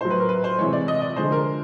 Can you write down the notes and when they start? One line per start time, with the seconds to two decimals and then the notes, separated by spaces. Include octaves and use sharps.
0.01 A2 F#3 C5
0.10 B4
0.20 A#4
0.29 B4
0.44 C5
0.59 C3 E3 G#3 C#5
0.73 D5
0.88 D#5
1.02 D5
1.16 D3 F3 G#3 C5
1.32 A#4